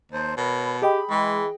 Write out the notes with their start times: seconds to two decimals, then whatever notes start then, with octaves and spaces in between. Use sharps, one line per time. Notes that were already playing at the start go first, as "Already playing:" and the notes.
0.12 D#2 C5 A5 G6
0.37 B2 A#4 C#5 B5
0.82 G4 G#4 D#5 G5 B5
1.10 E3 G#3